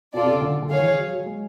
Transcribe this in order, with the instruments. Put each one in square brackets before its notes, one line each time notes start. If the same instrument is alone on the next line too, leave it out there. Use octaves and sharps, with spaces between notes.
[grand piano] B2 [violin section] F4 A4 D5
[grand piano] C3
C#3
D3
D3
[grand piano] D#3 [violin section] G#4 C#5 F5
[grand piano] E3
F#3
F#3
G#3